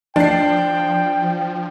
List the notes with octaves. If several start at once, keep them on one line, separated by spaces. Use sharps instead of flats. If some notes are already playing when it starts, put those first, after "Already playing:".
F3 D4 G5 C7